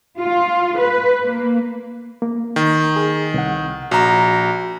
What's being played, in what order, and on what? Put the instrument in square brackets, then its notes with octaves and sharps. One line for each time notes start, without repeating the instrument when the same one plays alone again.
[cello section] F4
B4
A#3
[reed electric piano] A#3
[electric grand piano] D#3
[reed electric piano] G#4
C2 F#5
[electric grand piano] A#1 A#5 [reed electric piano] F#4